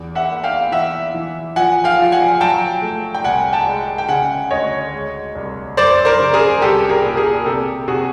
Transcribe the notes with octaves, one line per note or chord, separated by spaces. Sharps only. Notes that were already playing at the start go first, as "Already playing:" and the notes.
Already playing: E2
E5 F#5
A#3
F5 G5
E3 E5 F#5
E3
F3 F#5 G#5
F5 G5
F3
F#5 G#5
F#3 G5 A5
A3
G5
C2 F#5 G#5
G5 A5
G#3
G5
C#3 F#5 G#5
D2 C#5 D#5
G#3
C2
F#2 C5 D5
A#4 C5
C#3
G#4 A#4
C2 G4 A4
G#4 A#4
A#2
G#4 A#4
C3 G4 A4
C3 F#4 G#4